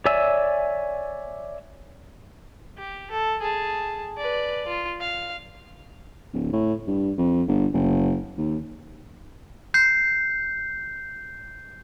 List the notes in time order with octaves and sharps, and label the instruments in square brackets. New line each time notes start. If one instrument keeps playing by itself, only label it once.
[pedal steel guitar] C#5 D5 E5 G#5 E6
[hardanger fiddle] G4
A4
G#4 A5
B4 D5
F4
F5
[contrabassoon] D1
A2
G2
F2
G1
F#1
D#2
[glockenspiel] G6 C7